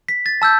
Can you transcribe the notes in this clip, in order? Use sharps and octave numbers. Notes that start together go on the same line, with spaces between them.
B6
A6
A5 E6 G6